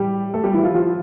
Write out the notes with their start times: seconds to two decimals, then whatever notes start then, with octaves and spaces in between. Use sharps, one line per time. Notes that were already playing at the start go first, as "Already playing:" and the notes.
Already playing: A2 E3 G3 G4
0.34 A3 A4
0.44 G3 G4
0.53 E3 E4
0.64 F3 F4
0.75 F3 F4